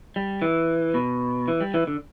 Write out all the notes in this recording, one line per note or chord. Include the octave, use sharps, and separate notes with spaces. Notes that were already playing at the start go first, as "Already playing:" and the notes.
G3
E3
B2
E3
G3
E3
D3